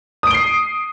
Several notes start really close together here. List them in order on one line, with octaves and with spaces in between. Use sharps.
D#6 D7 G7 C7